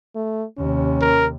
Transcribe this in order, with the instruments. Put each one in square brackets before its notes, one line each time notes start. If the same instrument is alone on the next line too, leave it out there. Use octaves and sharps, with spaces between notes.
[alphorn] A3
[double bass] D#2 C3 [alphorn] C#4
[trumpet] A#4